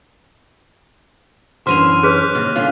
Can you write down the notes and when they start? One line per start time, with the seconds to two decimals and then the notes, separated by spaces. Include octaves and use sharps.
1.67 F#2 D3 E3 C5 F6 D#7 F7
2.03 G#4 B4 C#5 F#6 B6
2.35 D#2 C3
2.56 B2 D3 C#4 F4